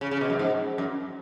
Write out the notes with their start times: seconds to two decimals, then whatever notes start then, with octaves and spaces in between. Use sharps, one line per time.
0.01 C#3
0.11 C#3
0.21 B2
0.30 F#2
0.39 G#2
0.78 F#2